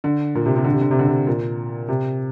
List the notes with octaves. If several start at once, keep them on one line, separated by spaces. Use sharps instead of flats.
D3
A#2
C3
C3
D3
C3
D3
C3
D3
C3
A#2
C3